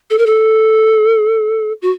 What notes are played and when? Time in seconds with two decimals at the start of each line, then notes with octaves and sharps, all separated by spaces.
0.10 A4
0.18 A#4
0.26 A4
1.82 F#4